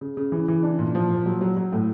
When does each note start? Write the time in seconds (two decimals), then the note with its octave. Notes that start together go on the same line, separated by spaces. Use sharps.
0.01 C#3
0.17 C#3
0.32 E3
0.48 E3
0.63 D4
0.79 A#2
0.95 F3
1.10 A#2
1.26 F#3
1.41 F#3
1.57 F#3
1.72 A2